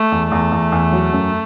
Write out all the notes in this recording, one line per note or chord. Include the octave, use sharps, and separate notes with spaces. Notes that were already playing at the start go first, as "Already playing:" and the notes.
Already playing: A3
E2
E2 A3
E2
E2
F#3
F#2